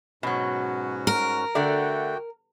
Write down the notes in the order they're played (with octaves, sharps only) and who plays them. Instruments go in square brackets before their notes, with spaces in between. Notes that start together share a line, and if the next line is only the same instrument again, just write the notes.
[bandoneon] G#2 C#4 F#4 [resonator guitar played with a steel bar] B2 F#3
[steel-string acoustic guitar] A#4
[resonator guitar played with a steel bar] D3 A3 D5 [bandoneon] F#4 G5